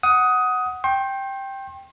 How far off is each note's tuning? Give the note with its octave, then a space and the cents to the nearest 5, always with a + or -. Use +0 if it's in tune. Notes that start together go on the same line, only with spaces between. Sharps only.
F#5 +0 D#6 +15
G5 +0 C6 +40